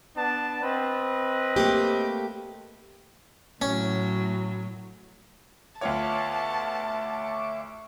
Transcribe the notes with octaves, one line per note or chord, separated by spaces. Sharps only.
B3 D4 A5
C4 B4 D#5
A3 A#3 G4
A2 F#3 C#4
D2 B3 F4 C#5 E5 A5 C#6 D6